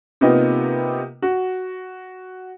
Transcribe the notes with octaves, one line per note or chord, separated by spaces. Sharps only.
C3 A#3 B3 D#4 F4 G4
F#4